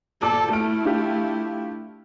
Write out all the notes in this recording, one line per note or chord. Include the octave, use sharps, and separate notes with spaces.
A#1 A4 A5 D6
A3 E4 F6 D7
D4 F4 G4